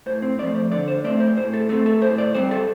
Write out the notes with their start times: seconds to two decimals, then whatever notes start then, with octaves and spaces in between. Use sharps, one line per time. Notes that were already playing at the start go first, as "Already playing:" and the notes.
0.06 A2 C5
0.22 C4
0.39 F3 A3 C4 D5
0.55 C5
0.72 D3 D5
0.88 C5
1.04 A3 C4 D5
1.20 C5
1.37 A2 C5
1.54 A4
1.69 A3 C4 A4
1.86 A4
2.01 A2 C5
2.18 D5
2.35 G3 C4 C5
2.51 A4